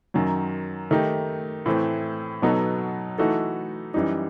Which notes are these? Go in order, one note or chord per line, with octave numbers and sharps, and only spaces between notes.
F#2 D#3 F#3
D#3 A3 D#4 G4
A2 E3 A3 C4
B2 F#3 B3 D#4 A4
E3 A3 D#4 F#4 A4
F#2 E3 G3 D#4